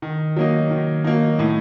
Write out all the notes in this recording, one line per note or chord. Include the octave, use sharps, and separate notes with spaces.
D#3
F#3 A#3 D#4
D#3
F#3 A#3 D#4
A2